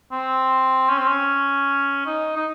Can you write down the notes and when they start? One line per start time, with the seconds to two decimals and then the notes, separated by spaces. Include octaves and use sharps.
0.12 C4
0.89 C#4
0.99 C4
1.08 C#4
2.06 D#4
2.36 D#4